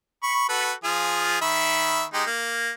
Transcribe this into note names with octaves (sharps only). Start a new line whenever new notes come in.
B5 C#6
F#4 A4 B4
F3 F4 G#4
D#3 E5 B5
G#3 D#4 G4
A#3